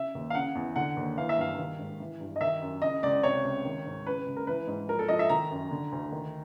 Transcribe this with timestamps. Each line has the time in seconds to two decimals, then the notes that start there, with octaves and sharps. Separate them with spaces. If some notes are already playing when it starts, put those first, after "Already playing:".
Already playing: C#3 E5
0.15 D#2
0.30 F5
0.34 C#3 F#5
0.55 E2
0.76 D3 F#5
0.97 D#2
1.17 E3 F5
1.29 E5
1.38 G2 F5
1.58 D#3
1.79 G#2
2.00 E3
2.20 G2
2.36 D#5
2.41 D#3 E5
2.61 F#2
2.82 C#3 D#5
3.03 C#2 D5
3.23 C3 C#5
3.45 C#2
3.65 D#3
3.86 G#2
4.06 C#3 B4
4.26 C#2
4.37 A#4
4.47 E3 B4
4.67 G#2
4.89 F3 A#4
4.99 A4
5.09 F3 D#5
5.19 E5
5.29 D#3 A#5
5.51 F#2
5.71 D3
5.92 D2
6.12 D#3